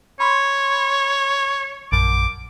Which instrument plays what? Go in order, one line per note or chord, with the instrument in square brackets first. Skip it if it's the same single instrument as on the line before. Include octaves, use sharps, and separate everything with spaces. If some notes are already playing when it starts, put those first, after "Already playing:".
[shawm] C#5 [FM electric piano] B5 C6
[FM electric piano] A#1 F#2 [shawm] D6